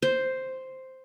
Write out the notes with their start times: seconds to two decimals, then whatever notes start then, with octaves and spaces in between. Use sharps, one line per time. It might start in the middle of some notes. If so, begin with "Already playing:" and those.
0.02 C5